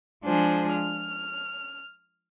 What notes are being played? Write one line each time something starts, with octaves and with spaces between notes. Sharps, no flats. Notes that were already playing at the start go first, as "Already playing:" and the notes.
F3 G#3 D4 F4 G#4 C5
F6